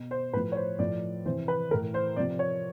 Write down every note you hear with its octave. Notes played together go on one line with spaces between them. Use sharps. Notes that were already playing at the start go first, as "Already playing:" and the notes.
Already playing: B2
C5
A2 F3 B4
C#5
C5
A2 F3 D5
C3 E3 C5
B4
A2 E3 A#4
C5
C3 F3 D5
C#5